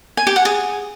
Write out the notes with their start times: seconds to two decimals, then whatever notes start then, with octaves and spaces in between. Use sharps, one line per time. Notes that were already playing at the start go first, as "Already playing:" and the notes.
0.17 G#5
0.27 G4
0.36 F#5
0.45 G#4